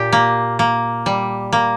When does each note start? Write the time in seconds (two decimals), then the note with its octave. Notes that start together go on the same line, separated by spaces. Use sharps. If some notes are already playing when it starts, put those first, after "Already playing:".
Already playing: A#2 G4
0.12 A#3
0.59 A#3
1.06 G3
1.53 A#3